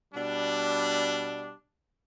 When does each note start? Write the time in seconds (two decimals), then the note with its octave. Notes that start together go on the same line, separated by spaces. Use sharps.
0.14 B2 G3 D4